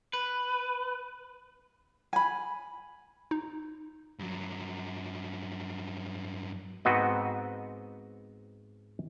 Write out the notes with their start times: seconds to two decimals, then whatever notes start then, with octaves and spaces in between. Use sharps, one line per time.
0.13 B4
2.13 G#5 B5
3.31 D#4
4.19 G2 F#3
6.85 G#2 B3 C4 F#4 D#5